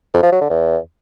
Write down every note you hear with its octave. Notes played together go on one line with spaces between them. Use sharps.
F2
F3
F#3
D3
E2